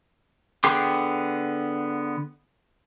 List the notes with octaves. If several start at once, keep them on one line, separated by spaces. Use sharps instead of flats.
D3 B3 G#4 G5 D6